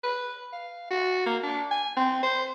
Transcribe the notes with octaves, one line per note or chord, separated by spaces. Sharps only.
B4
F5
F#4
A#3
D4
G#5
C4
C5